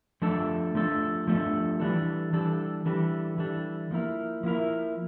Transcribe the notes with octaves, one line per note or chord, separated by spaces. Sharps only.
F3 A3 D4 A4
F3 A3 D4 A4
F3 A3 D4 A4
E3 G3 D4 A4
E3 G3 D4 A4
E3 G3 D4 A4
E3 G3 D4 A4
F3 A#3 E4 A#4
F3 A#3 E4 A#4